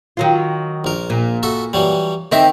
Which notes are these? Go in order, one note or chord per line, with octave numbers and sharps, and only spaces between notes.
D#3 F#3 F4
A#1 A#4
A#2
F#4 A4 E5
E3 F#3 G3
D#3 C4 E4 D#5 E5 D6